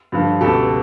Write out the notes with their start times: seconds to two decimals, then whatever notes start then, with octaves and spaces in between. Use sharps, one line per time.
0.12 G2 D3 F3
0.41 C#2 B2 G4 A4